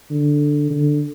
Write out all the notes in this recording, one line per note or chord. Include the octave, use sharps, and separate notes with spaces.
D3
D3